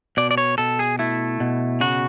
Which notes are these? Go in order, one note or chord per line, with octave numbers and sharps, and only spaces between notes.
B2 D5
D5
C#5
B2 A4
G#4
A3 E4
B2
C#3 F#4